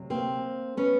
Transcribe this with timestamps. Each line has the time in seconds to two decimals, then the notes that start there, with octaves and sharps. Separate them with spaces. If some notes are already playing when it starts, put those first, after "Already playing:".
Already playing: D2 C3 F#3
0.10 A#3 C4
0.77 B3 C#4